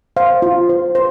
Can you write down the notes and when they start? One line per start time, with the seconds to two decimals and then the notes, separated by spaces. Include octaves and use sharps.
0.16 C5 F5
0.42 F4
0.69 C5
0.95 C5